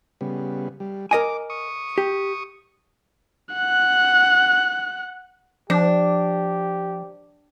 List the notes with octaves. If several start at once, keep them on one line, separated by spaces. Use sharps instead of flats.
C#3 G3 B3
G3
A#4 D#5 G#5 D6
C#6 D#6
G4
F#5 F#6
F3 D4 G4